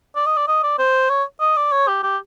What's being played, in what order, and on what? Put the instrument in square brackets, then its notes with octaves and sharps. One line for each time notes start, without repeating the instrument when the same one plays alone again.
[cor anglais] D5
D#5
D5
D#5
D5
C5
C#5
D#5
D5
C#5
G4
G4